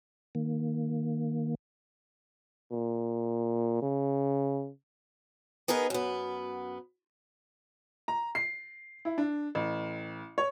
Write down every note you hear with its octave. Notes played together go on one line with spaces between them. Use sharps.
D#3 A#3
A#2
C#3
B3 D#4 G#4 A#4 B4
F#2 B3
A#5
C7
E4
D4
A1
C#5